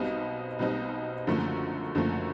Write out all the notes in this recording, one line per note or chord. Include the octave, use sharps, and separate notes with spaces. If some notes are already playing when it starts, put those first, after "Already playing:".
Already playing: B1 B2 G3 C4 D#4
B1 B2 G3 C4 D#4
F#1 F#2 D3 F3 A3
F#1 F#2 D3 F3 A3